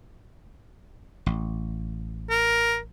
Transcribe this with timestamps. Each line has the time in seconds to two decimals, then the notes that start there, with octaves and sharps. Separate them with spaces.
1.26 A1
2.30 A#4